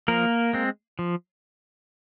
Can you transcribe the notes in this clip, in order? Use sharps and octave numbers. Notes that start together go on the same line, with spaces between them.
F3 A#3 A#4
G#3 C4
F3